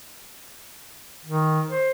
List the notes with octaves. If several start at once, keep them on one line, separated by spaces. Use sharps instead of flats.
D#3
C5